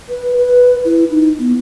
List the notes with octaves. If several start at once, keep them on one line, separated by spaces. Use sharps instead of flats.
B4
B4
E4
D#4
B3